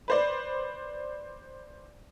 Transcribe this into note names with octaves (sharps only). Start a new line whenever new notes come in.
B4 C5 D5